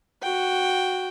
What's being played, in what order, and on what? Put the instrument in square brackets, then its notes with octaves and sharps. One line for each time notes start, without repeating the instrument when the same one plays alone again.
[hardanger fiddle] F#4 G5